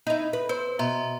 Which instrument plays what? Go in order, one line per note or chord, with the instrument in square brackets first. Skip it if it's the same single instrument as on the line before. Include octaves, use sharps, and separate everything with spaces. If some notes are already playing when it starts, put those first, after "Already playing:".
[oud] D#4 E4
B4
[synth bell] B4 [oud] C5
[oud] B2 [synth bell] E5 A#5 C6